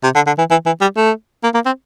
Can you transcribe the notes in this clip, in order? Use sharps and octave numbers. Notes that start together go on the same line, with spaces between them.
C3
D3
D3
E3
E3
E3
G3
A3
A#3
A#3
C4